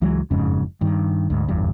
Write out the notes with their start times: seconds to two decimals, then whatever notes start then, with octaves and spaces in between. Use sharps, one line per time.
0.02 C#2 E3 F#3 G#3
0.31 F#1 F2 G#2 C#3
0.81 G2 D#3
1.30 D2 G#2
1.48 D1 G1 E2 G2